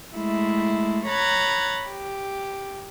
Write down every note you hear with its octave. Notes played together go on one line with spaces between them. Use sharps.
G#3 A3 E4
C#5 A#5 B5 F#6 G#6 A6
G4